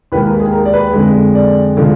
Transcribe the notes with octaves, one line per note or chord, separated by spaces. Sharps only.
D#2 D#3 G#3 B4
A#4
G#4
A#4
D5
B4
F2 D3 G#3
D5
D3 F3 G#3